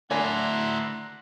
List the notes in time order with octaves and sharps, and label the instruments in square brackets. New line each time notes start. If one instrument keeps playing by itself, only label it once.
[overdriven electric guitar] D2 E4 [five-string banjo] D4 G#5 [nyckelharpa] F#5 [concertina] A#5 C6